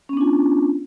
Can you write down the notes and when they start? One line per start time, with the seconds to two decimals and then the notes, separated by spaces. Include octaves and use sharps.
0.09 C#4
0.13 B3
0.17 D4
0.21 F4